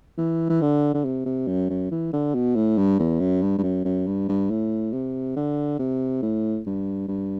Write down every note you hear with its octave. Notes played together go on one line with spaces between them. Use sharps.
E3
E3
D3
D3
C3
C3
F#2
F#2
E3
D3
B2
A2
G2
E2
F#2
G2
G2
F#2
F#2
G2
G2
A2
C3
D3
C3
A2
G2
G2